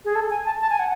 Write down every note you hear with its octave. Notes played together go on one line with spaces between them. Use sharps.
G#4
A4
G#5
A5
A5
G#5
F#5